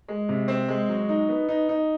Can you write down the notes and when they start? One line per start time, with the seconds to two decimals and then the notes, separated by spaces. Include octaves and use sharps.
0.08 G#3
0.29 C3
0.48 C4
0.69 G#3
0.89 F#3
1.09 D#4
1.29 B3
1.48 D#4
1.69 D#4